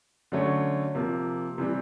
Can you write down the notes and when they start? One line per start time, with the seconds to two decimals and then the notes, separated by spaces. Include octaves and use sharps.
0.32 D3 F#3 A3 C#4
0.95 C3 F3 A#3
1.58 C3 E3 G3